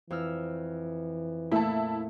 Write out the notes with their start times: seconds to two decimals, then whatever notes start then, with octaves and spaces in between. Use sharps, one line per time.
0.10 F2 E3 E6 F6
1.52 A#2 A3 E4 A5